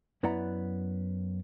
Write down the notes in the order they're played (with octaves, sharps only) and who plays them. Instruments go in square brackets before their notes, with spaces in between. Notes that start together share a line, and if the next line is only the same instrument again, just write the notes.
[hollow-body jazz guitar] F#2 B3 E4 D5 F#5 A#5